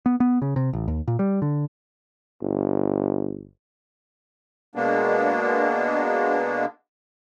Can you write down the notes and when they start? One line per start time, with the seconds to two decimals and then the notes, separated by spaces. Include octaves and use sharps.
0.06 B3
0.20 B3
0.42 C#3
0.56 C3
0.73 A1
0.88 D#2
1.08 A#2
1.19 G3
1.42 D3
2.42 G1
4.76 B2 G#3 A#3 B3 D4